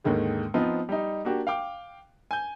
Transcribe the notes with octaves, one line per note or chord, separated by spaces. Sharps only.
D#2 G#2 D3 D#3 G#3
F3 B3 C4 D#4 F4
G3 D#4
A#3 D4 F#4 G4
F5 G5 D6
G#5 G6